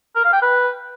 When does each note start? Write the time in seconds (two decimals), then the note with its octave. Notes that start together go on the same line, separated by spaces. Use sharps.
0.15 A#4
0.24 F5
0.33 G5
0.42 B4